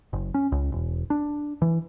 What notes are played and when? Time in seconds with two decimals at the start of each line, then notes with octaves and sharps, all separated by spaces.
0.13 F#1
0.34 C#4
0.52 C#2
0.72 E1
1.10 D4
1.62 E3